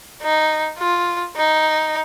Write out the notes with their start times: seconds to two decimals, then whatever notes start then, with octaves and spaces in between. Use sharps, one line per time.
0.22 D#4
0.79 F4
1.36 D#4